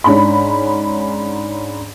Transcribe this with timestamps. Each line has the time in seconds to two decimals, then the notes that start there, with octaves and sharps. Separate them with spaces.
0.04 G#2 C#4 D4 B5